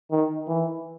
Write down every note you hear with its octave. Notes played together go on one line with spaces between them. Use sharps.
D#3
E3